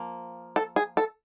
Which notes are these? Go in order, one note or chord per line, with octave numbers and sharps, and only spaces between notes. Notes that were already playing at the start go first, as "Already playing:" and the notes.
Already playing: F3 A#3
A4
G#4
A4